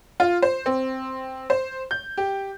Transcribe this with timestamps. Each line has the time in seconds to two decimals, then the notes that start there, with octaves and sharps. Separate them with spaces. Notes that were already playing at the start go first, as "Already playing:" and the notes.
0.20 F4
0.42 C5
0.66 C4
1.50 C5
1.91 G6
2.17 G4